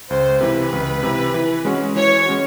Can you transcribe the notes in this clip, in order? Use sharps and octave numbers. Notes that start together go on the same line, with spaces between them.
C#2 C5
C3 E3 B4
C#2
C3 E3
E3
G#3 C#4 F#4
E3 C#5
G#3 C#4 F#4